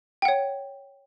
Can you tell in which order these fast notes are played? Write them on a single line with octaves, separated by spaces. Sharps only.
G5 F#5 C#5